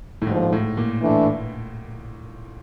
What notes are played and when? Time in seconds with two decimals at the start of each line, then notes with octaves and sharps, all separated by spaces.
0.22 A2
0.27 D#2 G#2 D3 F3
0.52 A2
0.77 A#2
1.02 E3 A3 D4